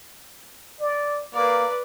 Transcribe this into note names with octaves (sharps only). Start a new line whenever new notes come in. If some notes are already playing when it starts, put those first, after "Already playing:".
D5
A#3 B4 D5